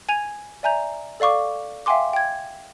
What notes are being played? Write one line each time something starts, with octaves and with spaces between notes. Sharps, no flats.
G#5 G#6 D#7 F7
D5 E5 G#5 A#5 G6 F7
A4 D5 F5 C#6 D6
E5 F5 G5 G#5 C6 D6
G5 G#6